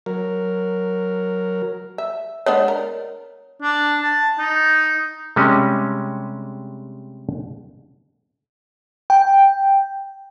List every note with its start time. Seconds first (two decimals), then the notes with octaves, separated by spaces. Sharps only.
0.06 F#3 A#4
1.98 E5
2.46 G#3 B3 D4 C#5
2.68 A#4
3.62 D4
4.02 A5
4.39 D#4
5.36 C3 G3 G#3 C#4
9.10 G5